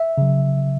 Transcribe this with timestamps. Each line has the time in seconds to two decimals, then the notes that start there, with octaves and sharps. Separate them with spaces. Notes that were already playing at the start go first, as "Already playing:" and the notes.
Already playing: E5
0.18 C#3 F#3